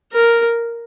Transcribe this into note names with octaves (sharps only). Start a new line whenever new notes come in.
A#4